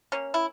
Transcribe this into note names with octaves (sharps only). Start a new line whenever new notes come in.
A#3 C#4
E4